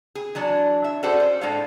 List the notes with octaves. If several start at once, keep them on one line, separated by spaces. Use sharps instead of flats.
G#4
E3 F#3 D4
E5
C#4 F#4 G#4 A4 C5 D5
C5
A2 G#3 D4 A4 F5